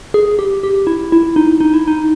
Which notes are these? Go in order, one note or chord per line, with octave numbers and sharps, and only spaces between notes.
G#4
G4
G4
E4
E4
D#4
D#4
E4
D#4